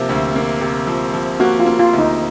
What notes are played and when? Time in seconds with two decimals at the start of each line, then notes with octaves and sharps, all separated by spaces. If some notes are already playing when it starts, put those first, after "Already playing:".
Already playing: C3 F3 A#3
0.09 D2
0.36 A#3
0.61 C3
0.87 F3
1.14 F3
1.40 A#3 F#4
1.60 F4
1.66 A#3
1.79 F4
1.93 D2
1.98 D#4